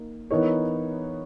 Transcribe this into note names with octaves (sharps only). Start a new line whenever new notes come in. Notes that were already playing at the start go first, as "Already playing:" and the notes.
Already playing: A#3 D#4 A#4
E3 B3 D#4 A#4 C#5